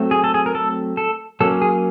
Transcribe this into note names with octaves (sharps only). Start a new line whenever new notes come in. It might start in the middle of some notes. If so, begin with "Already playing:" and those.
Already playing: F#3 A3 C4
G#4
A4
G#4
A#4
A4
A4
F#3 A#3 C#4 A4
G#4